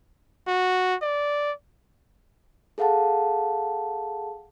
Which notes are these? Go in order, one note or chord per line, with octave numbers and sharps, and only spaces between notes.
F#4
D5
G#4 A4 F5 F#5 A5